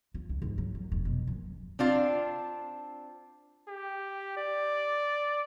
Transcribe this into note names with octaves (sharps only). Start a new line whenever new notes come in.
F4
C#2
G#2
F#3
F#2
F1
B2
F#2
C4 D4 F4
G4
D5